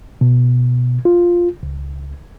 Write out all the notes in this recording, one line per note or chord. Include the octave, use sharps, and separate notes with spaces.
B2
F4
C#2